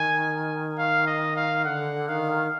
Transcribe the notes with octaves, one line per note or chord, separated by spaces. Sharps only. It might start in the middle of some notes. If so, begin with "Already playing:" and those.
Already playing: D#3 G#5
F5
D#5
F5
D3 F#5
D#3 F5